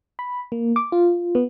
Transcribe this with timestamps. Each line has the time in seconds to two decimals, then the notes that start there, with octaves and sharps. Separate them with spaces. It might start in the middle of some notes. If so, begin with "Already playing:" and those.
0.19 B5
0.52 A#3
0.76 D6
0.92 F4
1.35 B3